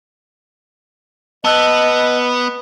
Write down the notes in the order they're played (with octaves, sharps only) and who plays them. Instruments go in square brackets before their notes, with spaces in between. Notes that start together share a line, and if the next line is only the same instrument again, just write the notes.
[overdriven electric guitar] B3 [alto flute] D#5 [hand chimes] A5 E6 F#6